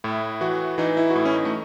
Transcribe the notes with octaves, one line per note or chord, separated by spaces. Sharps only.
A2 E4
E3 F#4
E3 D#4
E4
F#4
A2 E4
C#4
D#4
A3